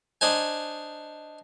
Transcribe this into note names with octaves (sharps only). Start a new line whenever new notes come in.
D4 D#4 C5 G#5